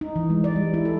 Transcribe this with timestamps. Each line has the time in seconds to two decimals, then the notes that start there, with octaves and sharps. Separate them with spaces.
0.01 D#4
0.16 E3
0.30 G#3
0.44 D5
0.56 G3
0.74 E4
0.85 A4